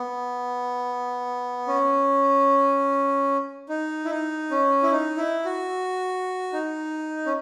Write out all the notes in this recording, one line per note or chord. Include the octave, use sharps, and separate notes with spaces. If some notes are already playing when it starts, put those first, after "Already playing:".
Already playing: B3
C#4
D#4
E4
D#4
C#4
E4
D#4
E4
F#4
D#4
C#4